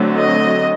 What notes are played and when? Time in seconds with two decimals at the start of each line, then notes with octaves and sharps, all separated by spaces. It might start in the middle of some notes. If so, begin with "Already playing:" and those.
Already playing: D3 F#3 A3 C4
0.17 D#5